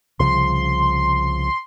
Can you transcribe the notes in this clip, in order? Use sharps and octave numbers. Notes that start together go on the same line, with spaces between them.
C2 C#3 F3 C6